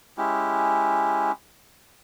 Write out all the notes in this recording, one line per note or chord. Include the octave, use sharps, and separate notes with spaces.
G#3 C#4 E4 G4